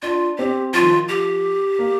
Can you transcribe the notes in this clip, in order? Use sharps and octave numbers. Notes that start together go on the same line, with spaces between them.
D4 F4
C4 G4
F3 F4
D#3
F3
G4
A#3